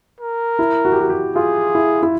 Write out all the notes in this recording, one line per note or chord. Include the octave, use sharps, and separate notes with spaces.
A#4
E4
F#4
G4
F#4
G4
F4 G#4
E4
E4